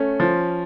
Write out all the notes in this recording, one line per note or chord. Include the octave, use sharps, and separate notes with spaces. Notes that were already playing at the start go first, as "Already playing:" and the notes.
Already playing: A3 C#4
F3